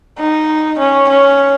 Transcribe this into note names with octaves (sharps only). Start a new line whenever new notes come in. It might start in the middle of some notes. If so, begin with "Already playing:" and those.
D#4
C#4
C#4